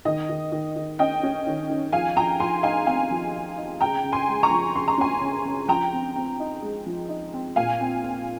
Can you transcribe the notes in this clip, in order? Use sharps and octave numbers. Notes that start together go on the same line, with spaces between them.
D#3 D#5
D#3
D#3
D#3
C#4 D#5 G5
C#4
D#3
D#3
F3 F5 G#5
F3 G5 A#5
F3 G#5 C6
D#4 F5 G#5
C4 F5 G#5
F3
D#4
D#4
C#3 G5 A#5
C#3
G#5 C6
G#3
A#5 C#6
F3
C#3 C6
A#5
C#4 G#5 C6
C#3
C#3
F3 G5 A#5
C4
C4
D#4
G#3
F3
D#4
C4
A#2 F5 G#5
C4
C4